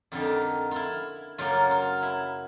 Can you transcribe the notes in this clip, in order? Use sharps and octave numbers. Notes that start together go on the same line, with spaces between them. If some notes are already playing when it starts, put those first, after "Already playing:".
F2 D3 G3 A#3 D#4 F4
E4 F4
F#2 C#3 F#3 A#3 F4
F4
E4